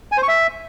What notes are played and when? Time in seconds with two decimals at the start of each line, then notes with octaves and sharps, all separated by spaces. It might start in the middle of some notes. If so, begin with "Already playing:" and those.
0.12 G#5
0.17 C5
0.23 C#6
0.28 E5